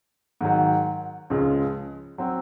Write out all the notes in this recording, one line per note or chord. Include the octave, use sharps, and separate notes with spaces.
G#2 D#3 F#3
C#2 C#3 F3 G#3
F#3 C4